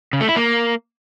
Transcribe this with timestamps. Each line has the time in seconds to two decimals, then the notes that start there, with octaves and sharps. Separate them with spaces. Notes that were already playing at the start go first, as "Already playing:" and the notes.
0.13 C#3
0.21 A3
0.29 E4
0.36 A#3